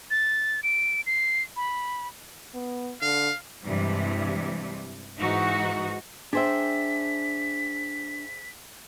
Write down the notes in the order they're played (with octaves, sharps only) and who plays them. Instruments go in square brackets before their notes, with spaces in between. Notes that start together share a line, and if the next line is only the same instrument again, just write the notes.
[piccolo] A6
D7
C7
B5
[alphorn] B3
[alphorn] D3 [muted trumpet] F5
[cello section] G2 C3 E3 G3 G#3
G#2 E3 D#4 F#4
[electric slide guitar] D4 G5 [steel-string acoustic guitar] G#4 C5 E5 [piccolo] B6